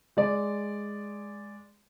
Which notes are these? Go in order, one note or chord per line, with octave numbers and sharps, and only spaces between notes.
G#3 D5